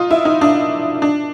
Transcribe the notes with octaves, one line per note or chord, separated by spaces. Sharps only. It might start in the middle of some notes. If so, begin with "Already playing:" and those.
Already playing: D#4 F4
E4
D#4
D4
D4